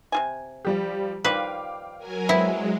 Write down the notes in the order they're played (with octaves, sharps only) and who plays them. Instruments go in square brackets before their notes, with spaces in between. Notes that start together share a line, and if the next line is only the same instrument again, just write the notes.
[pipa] C3 F4 G#5
[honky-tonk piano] F3 G3 G4
[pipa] D#3 F3 G3 [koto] B4 [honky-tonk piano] F5 G5 D6
[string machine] F#3 A#4 G#5
[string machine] F#3 G#3 [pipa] B3 C4 B5 [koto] E4 [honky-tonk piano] E5